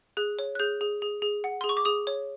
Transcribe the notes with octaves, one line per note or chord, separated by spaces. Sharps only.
G#4 F#6
C#5
F#6
G#4 G6
G#4
G#4
G#4
F#5
G#4 C6
C#6
D6
G#4 D#6
C#5